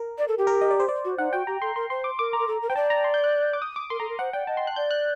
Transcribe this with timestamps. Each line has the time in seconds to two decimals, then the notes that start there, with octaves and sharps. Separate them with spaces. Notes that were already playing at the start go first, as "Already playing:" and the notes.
Already playing: A#4
0.18 D5
0.28 A4
0.38 G4
0.47 A#4
0.61 D#5
0.71 D5
0.80 C5
0.89 D5
1.05 F#4
1.18 D#4 F#5
1.33 F#4 G5
1.47 G4 A#5
1.62 A4 C6
1.76 A#4 C6
1.90 C5 C6
2.04 D6
2.19 A#4 D6
2.33 A#5
2.39 A#4
2.47 A4
2.62 A#4
2.69 C5 G5
2.76 D5 A5
2.90 A#5
3.04 C6
3.14 G6
3.24 F#6
3.53 D6
3.62 D#6
3.76 D6
3.90 A#4 C6
4.00 A4 A#5
4.09 A#4
4.19 C5 F#5
4.33 D5 G5
4.47 D#5 A5
4.57 C6
4.67 F#6
4.76 D5 G6
4.91 F#6